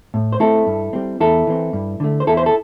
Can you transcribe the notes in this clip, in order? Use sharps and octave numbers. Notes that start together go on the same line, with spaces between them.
A2
C5
A3 C4 E4 A4
G2
G3 C4
E2 E4 A4
E3 C4
G2
D3 A3
C5
E2 E4 A4
C5
A4